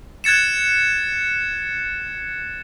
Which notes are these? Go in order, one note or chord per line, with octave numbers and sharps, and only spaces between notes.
F#6 G#6 A6 C#7 E7